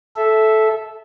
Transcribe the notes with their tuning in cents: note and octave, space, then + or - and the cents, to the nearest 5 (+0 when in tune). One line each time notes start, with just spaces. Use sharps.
A4 -15 E5 +0